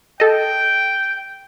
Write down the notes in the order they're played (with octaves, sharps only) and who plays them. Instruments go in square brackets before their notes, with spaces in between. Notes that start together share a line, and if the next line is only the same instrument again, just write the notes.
[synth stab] A4 D#5 [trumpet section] G5